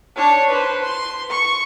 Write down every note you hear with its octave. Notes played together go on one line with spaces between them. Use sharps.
D4 C#5
B4 C5
C6
C#6